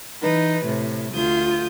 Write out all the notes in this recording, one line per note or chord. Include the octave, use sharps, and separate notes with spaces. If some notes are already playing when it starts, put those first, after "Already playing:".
E3 D#4 B4
A2 C3
D2 F4 D#6 G6